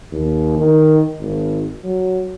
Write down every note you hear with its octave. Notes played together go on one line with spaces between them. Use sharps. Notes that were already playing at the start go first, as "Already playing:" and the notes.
D#2
D#3
G#1
F#3